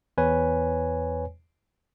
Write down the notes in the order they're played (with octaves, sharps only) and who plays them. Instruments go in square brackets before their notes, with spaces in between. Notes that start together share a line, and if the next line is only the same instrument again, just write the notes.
[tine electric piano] E2 B4 C#5 G#5